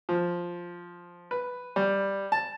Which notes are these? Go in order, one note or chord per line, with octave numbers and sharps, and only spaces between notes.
F3
B4
G3
A5